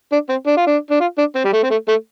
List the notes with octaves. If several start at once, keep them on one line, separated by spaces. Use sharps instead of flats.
D4
C4
D4
F4
D4
D4
F4
D4
C4
G3
A3
C4
A3
A3